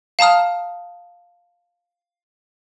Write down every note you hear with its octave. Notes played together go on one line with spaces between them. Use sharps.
F5 A5 A#5 D#6 F6